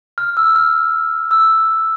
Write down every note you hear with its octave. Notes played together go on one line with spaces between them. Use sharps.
F6
E6
F6
E6